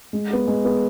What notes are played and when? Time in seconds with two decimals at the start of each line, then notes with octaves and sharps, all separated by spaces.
0.13 G#3
0.30 B3 G#4
0.47 G#3
0.65 B3 G#4